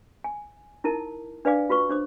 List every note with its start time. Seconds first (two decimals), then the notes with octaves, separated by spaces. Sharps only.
0.24 G#5
0.84 D#4 E4 A#4 A5
1.45 D4 B4 D5 F5 G#5 D6
1.69 F4 F#4 B4 C#6
1.89 D4 C5 D6